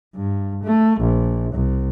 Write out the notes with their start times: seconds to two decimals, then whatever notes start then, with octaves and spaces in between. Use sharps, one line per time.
0.15 G2
0.64 A3
1.00 A#1
1.54 C2